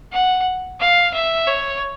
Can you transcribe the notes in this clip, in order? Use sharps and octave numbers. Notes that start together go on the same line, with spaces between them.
F#5
F5
E5
C#5